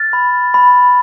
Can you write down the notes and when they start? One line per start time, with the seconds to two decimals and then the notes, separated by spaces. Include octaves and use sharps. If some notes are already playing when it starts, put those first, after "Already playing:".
Already playing: F6 A6
0.13 B5
0.54 B5